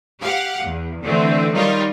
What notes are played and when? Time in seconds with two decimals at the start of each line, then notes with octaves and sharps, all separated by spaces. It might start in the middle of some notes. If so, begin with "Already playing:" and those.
0.21 G4 F5 F#5
0.63 E2
1.02 D3 E3 A3 C4
1.53 D#3 F#3 G3 D#4 F4 A#4